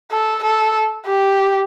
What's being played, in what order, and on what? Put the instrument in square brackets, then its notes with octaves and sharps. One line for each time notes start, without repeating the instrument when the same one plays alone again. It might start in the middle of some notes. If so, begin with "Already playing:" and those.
[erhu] A4
A4
G4